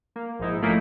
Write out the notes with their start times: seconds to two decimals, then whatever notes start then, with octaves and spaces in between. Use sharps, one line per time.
0.16 A#3
0.39 A#1 G#2 D#4 E4
0.62 F3 A3 A#3 C#4 D#4 E4